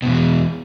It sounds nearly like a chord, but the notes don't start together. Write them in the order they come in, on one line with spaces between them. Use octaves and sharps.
B2 G2 E2